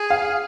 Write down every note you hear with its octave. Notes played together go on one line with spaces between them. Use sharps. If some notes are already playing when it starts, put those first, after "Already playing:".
Already playing: G#4
F5